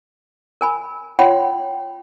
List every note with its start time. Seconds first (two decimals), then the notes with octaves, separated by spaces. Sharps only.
0.61 A#4 G#5 B5
1.19 F4 C#5 F#5 G5 B5 C6